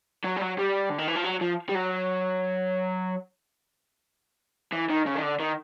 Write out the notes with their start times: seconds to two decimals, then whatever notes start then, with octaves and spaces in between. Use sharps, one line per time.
0.25 F#3
0.37 G3
0.42 F#3
0.58 G3
0.90 D3
0.98 D#3
1.08 E3
1.15 F3
1.24 F#3
1.41 F3
1.69 G3
1.75 F#3
4.73 E3
4.90 D#3
5.06 C#3
5.15 D#3
5.23 D3
5.40 D#3